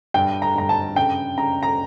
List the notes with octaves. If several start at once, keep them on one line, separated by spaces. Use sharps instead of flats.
G2 G5
A#5
G2 A#5
A5
C#3 G5
C#3 A#5
A#5